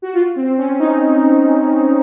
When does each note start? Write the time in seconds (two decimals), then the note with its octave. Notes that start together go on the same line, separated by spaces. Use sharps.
0.02 F#4
0.13 F4
0.36 C4
0.58 C#4
0.79 D#4